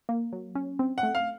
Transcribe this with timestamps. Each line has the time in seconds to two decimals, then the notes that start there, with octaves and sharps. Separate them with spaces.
0.09 A#3
0.33 F#3
0.55 C#4
0.79 C4
0.98 F#5
1.03 A3
1.15 F5